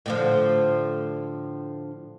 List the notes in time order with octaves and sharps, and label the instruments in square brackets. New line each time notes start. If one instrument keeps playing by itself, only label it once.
[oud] A2 D3 F3